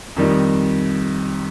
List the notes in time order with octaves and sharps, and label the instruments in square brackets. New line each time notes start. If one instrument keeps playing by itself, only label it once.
[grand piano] F2 D#3 G3 D#4